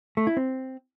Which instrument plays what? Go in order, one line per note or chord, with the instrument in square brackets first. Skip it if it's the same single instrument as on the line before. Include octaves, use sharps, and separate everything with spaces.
[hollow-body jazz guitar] A3
E4
C4